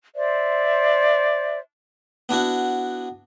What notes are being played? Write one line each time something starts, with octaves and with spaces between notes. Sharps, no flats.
C5 D5 E5
B3 D4 E4 F#4